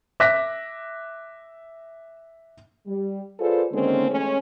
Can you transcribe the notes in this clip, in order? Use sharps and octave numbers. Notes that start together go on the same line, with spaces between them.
E5 D6 F#6 A#6 B6
G3
F4 G#4 A4 B4 C5 D5
D3 D#3 G#3 A#3 C4 C#4
E3 G#3 A3 C#4